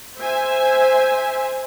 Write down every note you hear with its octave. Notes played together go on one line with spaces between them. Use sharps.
C5 E5 G#5